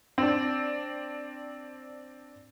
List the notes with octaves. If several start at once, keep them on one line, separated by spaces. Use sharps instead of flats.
C4 D4